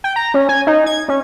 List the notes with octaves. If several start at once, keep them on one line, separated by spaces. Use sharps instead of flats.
G5
A#5
C#4
G#5
D#4
G#6
C#4